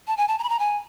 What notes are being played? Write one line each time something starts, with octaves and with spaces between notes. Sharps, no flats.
A5
G#5
A5
A#5
B5
A#5
G#5